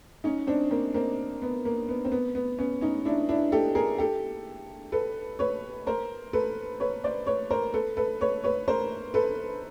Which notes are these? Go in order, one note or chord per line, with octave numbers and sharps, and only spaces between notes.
C#4 D#4
C4 D4
A#3 C4
A#3 C4
B3
A#3
B3
C4
B3
B3
B3 C#4
C#4 D#4
D4 E4
D4 E4
G4 A4
G#4 A#4
G4 A4
A4 B4
B4 C#5
A#4 C5
A4 B4
B4 C#5
C5 D5
B4 C#5
A#4 C5
A4 B4
A4 B4
B4 C#5
B4 C#5
A#4 C5
A4 B4